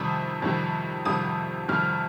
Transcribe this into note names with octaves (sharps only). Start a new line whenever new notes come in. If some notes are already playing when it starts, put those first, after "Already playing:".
Already playing: F2 C3 D#3 G3 D#6
F2 C3 D#3 G3
F2 C3 D#3 G3 D#6
F2 C3 D#3 G3 F6